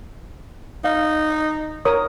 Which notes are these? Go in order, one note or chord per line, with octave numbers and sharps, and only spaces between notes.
D#4 F5
A#4 C#5 D#6